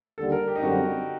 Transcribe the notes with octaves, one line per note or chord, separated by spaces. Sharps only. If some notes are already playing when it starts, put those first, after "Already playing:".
D#2 D3 G3 A4
A#4
G4
D#4
F#2 D3 G3 C4 F#4